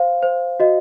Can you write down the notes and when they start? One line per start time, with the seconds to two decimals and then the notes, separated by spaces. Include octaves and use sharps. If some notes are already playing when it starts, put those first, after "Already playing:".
Already playing: C5 F5
0.23 C5
0.60 F#4 D#5